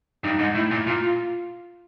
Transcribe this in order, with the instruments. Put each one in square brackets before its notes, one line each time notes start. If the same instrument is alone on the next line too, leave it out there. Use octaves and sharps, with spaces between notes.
[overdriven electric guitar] G2 [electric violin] D#4
[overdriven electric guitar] G#2
[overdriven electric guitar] A2 [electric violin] E4
[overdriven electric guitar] A#2
[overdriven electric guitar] A#2 [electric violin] F4